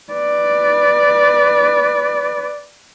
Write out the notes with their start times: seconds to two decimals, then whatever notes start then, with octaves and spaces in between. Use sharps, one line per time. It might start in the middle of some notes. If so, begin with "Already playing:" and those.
0.13 B4 D5